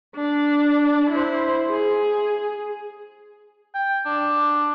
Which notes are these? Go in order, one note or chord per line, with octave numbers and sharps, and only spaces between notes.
D4
E4 C5
G#4
G5
D4